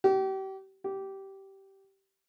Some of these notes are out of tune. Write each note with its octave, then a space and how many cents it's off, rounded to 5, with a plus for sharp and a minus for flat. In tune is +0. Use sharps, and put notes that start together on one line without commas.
G4 -35
G4 -15